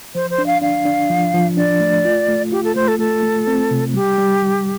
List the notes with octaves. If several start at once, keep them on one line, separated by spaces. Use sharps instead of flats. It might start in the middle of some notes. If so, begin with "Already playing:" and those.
F3 C5
C5
D4
F5
D4 F5
D4
F3
F3
D4 D5
A3
F4
A3
F4 G4
A4
A3 C5
A4
A3 A4
A3
C4
C3
G3 G4
G3
G3